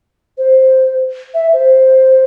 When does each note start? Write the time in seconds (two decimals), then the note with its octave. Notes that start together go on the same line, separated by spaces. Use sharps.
0.38 C5
1.34 E5
1.53 C5